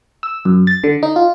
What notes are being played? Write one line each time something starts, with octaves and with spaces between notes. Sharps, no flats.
E6
F#2
A6
D3
D#4
F4